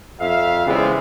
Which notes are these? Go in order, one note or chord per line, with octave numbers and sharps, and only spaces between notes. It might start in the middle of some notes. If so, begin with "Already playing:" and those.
F2 E5 F5
C#3 E3 G3 G#3 B3 C4